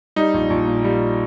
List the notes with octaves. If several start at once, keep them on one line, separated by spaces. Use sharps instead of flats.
G3 D#4
A#1
A#1
A#2
G3